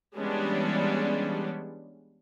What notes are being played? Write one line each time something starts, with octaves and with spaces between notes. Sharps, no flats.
E3 G3 G#3 B3 C#4 D4